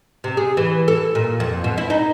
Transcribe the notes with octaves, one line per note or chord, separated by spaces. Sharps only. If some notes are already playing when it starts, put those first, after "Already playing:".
C3
G#4
E3
A4
A#2
F2
B2
E4
D#4